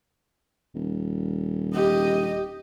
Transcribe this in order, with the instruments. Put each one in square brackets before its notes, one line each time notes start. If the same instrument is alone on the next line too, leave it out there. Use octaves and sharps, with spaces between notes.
[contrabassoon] D#1
[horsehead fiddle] G4 D#5